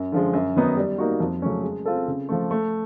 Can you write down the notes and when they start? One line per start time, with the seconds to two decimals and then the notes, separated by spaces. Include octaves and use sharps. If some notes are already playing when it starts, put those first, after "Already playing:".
Already playing: F#2
0.12 D3 F3 G#3
0.33 F#2
0.56 D#3 F#3 B3 D#4
0.77 G3
0.98 A#3 D#4 F#4
1.20 F2
1.42 C#3 F#3 A3 C#4
1.63 G#3
1.86 C4 F4 A4
2.08 C#3
2.29 F3 A3
2.51 A3